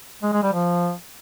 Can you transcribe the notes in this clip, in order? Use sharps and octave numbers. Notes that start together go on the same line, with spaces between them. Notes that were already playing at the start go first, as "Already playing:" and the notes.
G#3
G#3
G3
F3